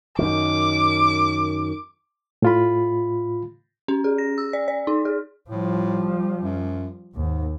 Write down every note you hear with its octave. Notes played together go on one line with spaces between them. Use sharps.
F#2 D#3 D6
A2 F4 B5
C#4
G#4
A#6
E6
D5
D5
D#4
G#4
A2 F3 G3
F#2
D#2 G#2